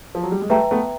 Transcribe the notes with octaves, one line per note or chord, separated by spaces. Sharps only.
F3
F#3
G3
G#3
G3 A3 B4 E5 G5 A#5
A3 B3